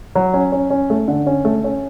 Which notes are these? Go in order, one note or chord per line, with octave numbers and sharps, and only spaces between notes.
F#3
C#4
C#4
C#4
A3
D3
C#4
A3
C#4